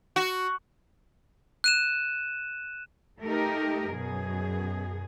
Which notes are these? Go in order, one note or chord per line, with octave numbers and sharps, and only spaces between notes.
F#4
F#6 D#7 E7
A3 D#4 G4 A#4
F#2 B2 G#4